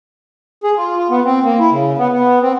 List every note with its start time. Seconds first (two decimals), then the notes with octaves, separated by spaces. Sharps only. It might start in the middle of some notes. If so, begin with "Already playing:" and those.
0.64 G#4
0.77 F4
0.97 F4
1.10 B3
1.25 C4
1.44 A#3
1.59 E4
1.71 C#3
1.98 B3
2.12 B3
2.42 C4